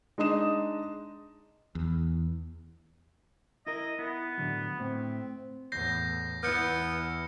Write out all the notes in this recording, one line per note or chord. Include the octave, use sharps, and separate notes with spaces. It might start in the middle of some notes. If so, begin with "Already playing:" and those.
G#3 D4 D#4 D#6 E7
E2
E4 A#4 D#5
B3 E4
A2 D3 F#3
A2 C4
E2 A2 G6 A#6 C7
E2 B3 E4 F6 G6 C#7